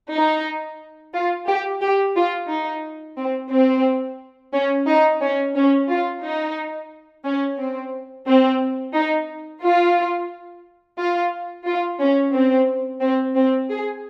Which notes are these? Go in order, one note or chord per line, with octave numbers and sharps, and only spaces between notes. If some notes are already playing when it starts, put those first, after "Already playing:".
D#4
F4
G4
G4
F4
D#4
C4
C4
C#4
D#4
C#4
C#4
F4
D#4
C#4
C4
C4
D#4
F4
F4
F4
C#4
C4
C4
C4
G#4